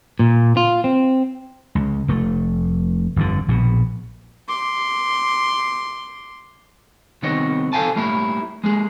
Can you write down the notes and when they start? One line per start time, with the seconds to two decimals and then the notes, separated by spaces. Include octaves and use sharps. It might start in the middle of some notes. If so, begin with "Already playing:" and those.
0.19 A#2
0.57 F4
0.84 C4
1.75 C#2
2.08 F1 A3
3.16 G1 F2 G#2 D3
3.48 A#1 B2
4.49 C6 D6
7.22 C2 D#3 B3 C4 C#5 D#5
7.73 A4 C5 C#5 F5 G#5 A5
7.96 G3 A3 A#3 E4
8.64 G#3 A#3 G#4